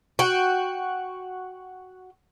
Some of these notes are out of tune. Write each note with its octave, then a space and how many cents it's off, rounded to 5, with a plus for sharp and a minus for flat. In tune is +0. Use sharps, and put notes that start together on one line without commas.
F#4 +0 G5 +0